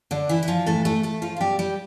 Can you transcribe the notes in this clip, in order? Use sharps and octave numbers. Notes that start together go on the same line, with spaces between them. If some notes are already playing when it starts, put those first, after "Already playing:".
D3 D4
E3 E4
E4
F3 F4
A2 E3 A3 A4
A3 A4
A3 A4
F3 F4
F4
B2 G3 G4
G3 G4